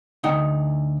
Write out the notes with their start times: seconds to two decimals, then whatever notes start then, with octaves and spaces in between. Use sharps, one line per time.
0.24 D2 D#4 F#5 G5